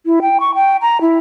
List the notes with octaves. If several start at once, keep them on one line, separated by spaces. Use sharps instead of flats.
E4
G5
C#6
G5
A#5
E4